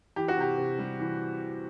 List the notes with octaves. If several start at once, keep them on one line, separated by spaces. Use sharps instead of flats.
E3 G4
F#4
C3 G4
C3
G3
E3